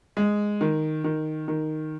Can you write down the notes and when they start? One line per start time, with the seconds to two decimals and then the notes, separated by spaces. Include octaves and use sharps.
0.17 G#3
0.61 D#3
1.04 D#3
1.48 D#3